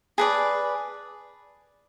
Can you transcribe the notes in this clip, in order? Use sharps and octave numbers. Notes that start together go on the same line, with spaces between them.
G#4 B4 D5 A5